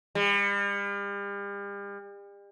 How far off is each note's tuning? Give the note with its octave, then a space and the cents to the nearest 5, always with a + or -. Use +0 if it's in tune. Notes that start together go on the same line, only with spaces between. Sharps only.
G3 +40